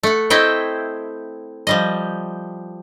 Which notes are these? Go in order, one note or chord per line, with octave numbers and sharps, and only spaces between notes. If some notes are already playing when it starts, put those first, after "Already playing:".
A3 F#5
A3 C4 E4 D#5 E5 G5
F3 G3 D#5